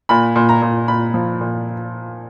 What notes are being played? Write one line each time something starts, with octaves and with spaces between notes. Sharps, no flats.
A#2 B5
A#2
A#5
A#2
A#2 B5
F3
A#2